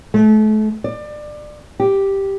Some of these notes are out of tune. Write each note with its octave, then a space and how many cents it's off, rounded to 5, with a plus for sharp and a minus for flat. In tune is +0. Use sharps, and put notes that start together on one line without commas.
A3 -35
D5 +25
G4 +0